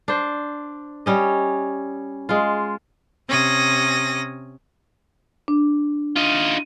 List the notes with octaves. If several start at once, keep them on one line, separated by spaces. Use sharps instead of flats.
D4 C5
G3 C#4 D#5
G#3 F4
C3 C#4 D#6 A#6
D4
D#4 F4